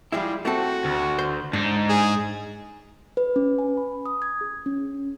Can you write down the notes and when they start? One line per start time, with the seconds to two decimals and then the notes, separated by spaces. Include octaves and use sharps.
0.12 F3 G3 G#3 E4
0.45 A3 C4 F#4 A4
0.85 D2
1.19 C5
1.53 G#2 D4 D#4
1.89 G#4
3.17 B4
3.36 C#4
3.58 G#5
3.77 B5
4.06 D#6
4.22 G#6
4.41 G#4
4.66 C#4